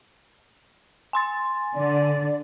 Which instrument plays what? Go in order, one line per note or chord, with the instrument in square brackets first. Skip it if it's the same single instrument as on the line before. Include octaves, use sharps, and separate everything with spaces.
[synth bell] G#5 C6 A6
[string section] D3 [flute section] D5